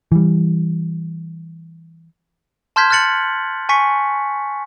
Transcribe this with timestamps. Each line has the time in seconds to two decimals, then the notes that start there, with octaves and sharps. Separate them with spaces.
0.12 E3 G3
2.76 A5 C6 F6 G6 G#6 B6
2.90 F6 F#6 A6 C#7 F#7
3.69 G#5 C#6 B6 C#7